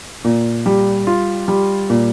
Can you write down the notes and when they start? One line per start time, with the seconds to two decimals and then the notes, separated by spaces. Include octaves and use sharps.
0.24 A#2
0.66 G3
1.07 F4
1.48 G3
1.90 A#2